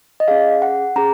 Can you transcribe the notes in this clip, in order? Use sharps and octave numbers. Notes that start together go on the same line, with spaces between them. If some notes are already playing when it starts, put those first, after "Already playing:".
D#5
C#4 G#4 F5
F#5
C#4 G#4 A#5